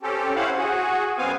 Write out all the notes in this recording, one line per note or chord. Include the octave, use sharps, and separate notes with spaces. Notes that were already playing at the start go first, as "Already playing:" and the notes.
C4 C#4 G4 A4
C#4 E4 C5 F5 F#5
F#4 G#4
F#2 B3 C4 F5 G#5